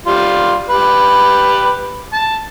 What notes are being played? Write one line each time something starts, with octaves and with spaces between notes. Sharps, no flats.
G3 F4
G4 B4
A5